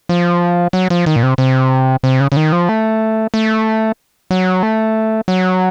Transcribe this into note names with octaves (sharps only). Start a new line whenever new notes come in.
F3
F#3
F3
D#3
A#2
C3
C3
C3
C#3
C#3
D#3
F3
A3
A3
F#3
A3
F#3